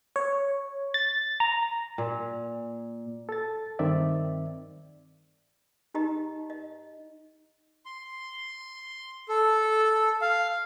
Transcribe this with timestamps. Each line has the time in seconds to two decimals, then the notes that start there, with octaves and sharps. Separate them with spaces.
0.16 C#5
0.94 A6
1.40 A#5
1.98 A#2
3.29 A4 A6
3.79 G2 D#3 C4 D5 E5
5.94 D#4 G4 D#5 A#5
6.50 D#5
7.86 C6
9.29 A4
10.21 F5